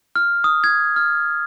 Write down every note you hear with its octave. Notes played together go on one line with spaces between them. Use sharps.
F6
D#6
G#6
F6